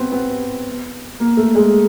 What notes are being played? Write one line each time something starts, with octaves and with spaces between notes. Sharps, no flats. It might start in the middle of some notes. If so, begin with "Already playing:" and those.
Already playing: B3 C4
B3
A#3
A3
G#3